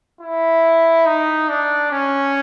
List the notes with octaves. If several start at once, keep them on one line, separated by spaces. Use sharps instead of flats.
E4
D#4
D4
C#4